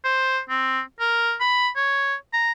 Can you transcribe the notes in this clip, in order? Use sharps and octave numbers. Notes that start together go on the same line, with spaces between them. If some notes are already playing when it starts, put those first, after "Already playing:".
C5
C4
A#4
B5
C#5
A#5